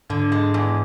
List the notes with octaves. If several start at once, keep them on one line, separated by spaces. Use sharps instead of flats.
G#2 D3
G#3
E2